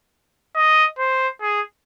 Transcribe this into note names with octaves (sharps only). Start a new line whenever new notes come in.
D#5
C5
G#4